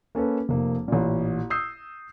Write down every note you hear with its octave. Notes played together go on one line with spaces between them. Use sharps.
A#3 C#4 A4 B4
F1 A#3
A1 A#2
D#6 E6 G6 C7